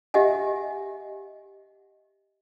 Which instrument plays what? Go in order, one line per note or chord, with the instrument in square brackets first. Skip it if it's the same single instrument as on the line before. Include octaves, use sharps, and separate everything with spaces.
[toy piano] G4 D#5 E5 F#5 G#5